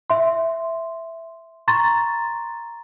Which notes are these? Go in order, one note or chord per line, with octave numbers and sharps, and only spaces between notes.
E5 C6
A#5 C6 C#6 A6